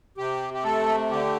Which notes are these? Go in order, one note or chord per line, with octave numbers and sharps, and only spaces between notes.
C3 G4
G4
A3 A4
D3 G4